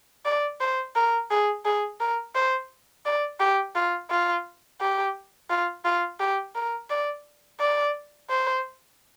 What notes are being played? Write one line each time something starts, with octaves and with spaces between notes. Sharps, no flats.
D5
C5
A#4
G#4
G#4
A#4
C5
D5
G4
F4
F4
G4
F4
F4
G4
A#4
D5
D5
C5